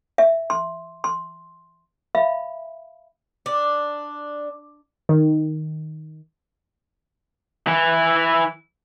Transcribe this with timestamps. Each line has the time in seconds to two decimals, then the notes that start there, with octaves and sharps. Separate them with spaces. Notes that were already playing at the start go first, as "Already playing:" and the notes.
0.18 E5
0.50 C6
1.04 C6
2.15 E5 F5 B5
3.46 D4
5.09 D#3
7.67 E3 E4